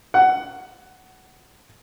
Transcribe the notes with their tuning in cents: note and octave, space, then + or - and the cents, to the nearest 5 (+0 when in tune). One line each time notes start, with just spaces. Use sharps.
F#5 +15